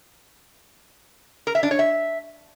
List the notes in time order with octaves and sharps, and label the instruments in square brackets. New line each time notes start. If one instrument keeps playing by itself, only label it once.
[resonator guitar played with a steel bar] A#4
E5
D4
C#5
E5